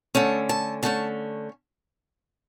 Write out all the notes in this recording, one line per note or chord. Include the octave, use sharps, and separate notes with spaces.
D3 A3 C#4 A5
A5
D3 A3 C#4 A5